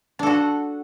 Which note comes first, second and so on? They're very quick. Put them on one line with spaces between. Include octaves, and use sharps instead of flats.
D4 A4 F#4 F#5